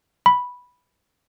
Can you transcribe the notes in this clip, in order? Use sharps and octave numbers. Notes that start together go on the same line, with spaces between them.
B5